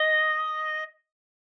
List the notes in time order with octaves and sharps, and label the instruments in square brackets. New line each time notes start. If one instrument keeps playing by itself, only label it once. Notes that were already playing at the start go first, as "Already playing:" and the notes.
Already playing: [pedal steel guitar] D#5